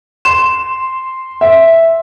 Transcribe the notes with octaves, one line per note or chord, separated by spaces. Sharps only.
C6 E7
E5